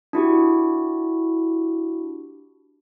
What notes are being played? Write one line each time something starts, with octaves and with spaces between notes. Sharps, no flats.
D4 E4 F#4 G4